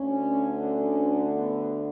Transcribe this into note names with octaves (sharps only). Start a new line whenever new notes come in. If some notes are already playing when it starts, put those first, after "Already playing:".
Already playing: D2 D3 C#4
C#4
B3